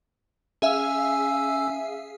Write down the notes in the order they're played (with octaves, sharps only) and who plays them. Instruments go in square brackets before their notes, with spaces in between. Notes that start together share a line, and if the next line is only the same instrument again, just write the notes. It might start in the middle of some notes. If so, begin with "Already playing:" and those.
[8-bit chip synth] C#4 G#5 E6 [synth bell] G#4 E5 F5